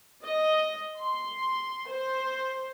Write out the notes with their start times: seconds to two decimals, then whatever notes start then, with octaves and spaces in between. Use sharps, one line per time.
0.23 D#5
0.99 C6
1.89 C5